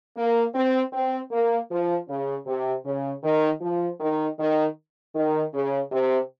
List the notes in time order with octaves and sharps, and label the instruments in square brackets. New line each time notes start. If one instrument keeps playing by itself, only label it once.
[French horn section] A#3
C4
C4
A#3
F3
C#3
C3
C#3
D#3
F3
D#3
D#3
D#3
C#3
C3